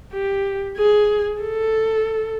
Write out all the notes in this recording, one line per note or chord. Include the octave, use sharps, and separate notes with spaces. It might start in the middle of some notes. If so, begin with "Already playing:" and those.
G4
G#4
A4